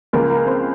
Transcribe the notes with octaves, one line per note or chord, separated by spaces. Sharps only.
C#2 C#3 F3 A#3 A#4
A#3 A#4
C4 C5